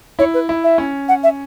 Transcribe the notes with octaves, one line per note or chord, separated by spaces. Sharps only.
E4 C#5
B4
E4
E5
C#4
F#5
E5